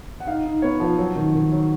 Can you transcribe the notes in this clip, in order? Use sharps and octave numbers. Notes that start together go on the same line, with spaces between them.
F#5
D#4 F5
D#4
B3 C#5
F3
F#3
D#3
D#3
F#3